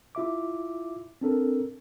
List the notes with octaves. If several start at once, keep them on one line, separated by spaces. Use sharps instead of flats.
E4 F4 E5 D6
C4 D4 A4 A#4